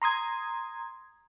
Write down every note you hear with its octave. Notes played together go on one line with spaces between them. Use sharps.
A#5 C6 D#6 G#6